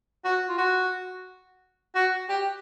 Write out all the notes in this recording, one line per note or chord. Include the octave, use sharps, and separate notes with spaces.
F#4
F4
F#4
F#4
G4